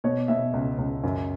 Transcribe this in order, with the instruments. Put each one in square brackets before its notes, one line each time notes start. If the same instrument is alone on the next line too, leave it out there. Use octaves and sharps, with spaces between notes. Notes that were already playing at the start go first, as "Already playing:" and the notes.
[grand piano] B2 C#5
B2 E5
C#2
C#2
F#2